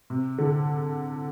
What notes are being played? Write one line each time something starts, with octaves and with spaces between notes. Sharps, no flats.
C3
D3